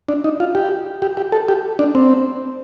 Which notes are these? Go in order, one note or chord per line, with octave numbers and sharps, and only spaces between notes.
D4
D#4
F4
G4
G4
G4
A4
G4
D4
C4